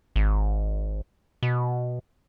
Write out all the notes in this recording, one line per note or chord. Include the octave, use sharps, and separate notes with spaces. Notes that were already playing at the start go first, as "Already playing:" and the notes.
G#1
B2